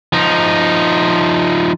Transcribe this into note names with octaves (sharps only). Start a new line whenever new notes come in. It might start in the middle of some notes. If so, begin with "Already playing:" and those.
F3 D#4